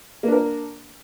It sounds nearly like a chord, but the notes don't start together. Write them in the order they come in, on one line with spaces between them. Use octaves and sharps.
A#3 D4 A#4